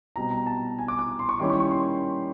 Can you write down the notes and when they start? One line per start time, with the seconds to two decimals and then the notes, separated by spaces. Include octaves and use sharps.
0.16 B2 G3 C4 A#5
0.31 A#5
0.46 A5
0.79 G#5
0.88 D6
0.99 D6
1.19 C6
1.29 C#6
1.39 D#3 G3 A#3 C#4 E4 D6
1.50 C#6
1.60 C#6
1.71 C6